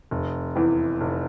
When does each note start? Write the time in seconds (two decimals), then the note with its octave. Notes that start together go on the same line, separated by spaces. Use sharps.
0.11 F1
0.56 E2 E3
1.01 F1